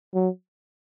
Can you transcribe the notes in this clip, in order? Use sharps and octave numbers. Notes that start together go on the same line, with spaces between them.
F#3